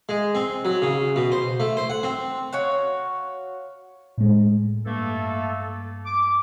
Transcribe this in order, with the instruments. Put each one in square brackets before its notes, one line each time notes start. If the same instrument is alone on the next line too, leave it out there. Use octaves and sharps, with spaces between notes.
[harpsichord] G#3
C4
F#3
C#3
B2
C5
A3
C5
F#5
C4
[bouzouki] F#4 C#5 F5 F#5
[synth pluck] A2 G#3
[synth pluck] G2 [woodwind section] A3 A#3 A4
[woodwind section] D6